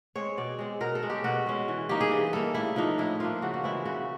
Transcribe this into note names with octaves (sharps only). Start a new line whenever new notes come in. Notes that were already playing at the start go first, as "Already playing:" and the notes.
G#3 C4 C#5
B2 D5
G#3 C4
B2 A#4
A4
G#3 C#4
G4
B2 F#4
G#3 C#4
E3
G3 A#3 D#4 G4
G#4
E3
G3 A#3 D#4 A4
A2 E4
F3 A#3 D4 D#4
A2 E4
F3 A#3 D4 F4
C#3 F#4
F#4
E3 G#3 C4 E4
C#3 F#4